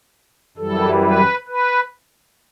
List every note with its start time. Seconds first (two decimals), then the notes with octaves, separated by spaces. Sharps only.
0.57 F#2 E3 G3 A4
1.03 B4
1.47 B4